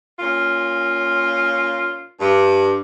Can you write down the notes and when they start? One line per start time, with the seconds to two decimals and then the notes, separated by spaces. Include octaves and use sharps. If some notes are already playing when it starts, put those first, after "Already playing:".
0.19 A#2 C#4 F4
2.20 G2